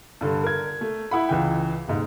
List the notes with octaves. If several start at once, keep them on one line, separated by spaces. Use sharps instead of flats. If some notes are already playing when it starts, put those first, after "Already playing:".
G2 D3
A#4 G#6
A3
E4 F#5 B5
C#2 E3 G5
D#1 G#2